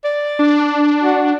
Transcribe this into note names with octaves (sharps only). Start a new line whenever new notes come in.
D5
D4
F#4